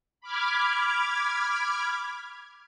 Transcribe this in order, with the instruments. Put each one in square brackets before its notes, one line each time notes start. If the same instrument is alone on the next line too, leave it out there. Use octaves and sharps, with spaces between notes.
[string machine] B5 D6 F6 G#6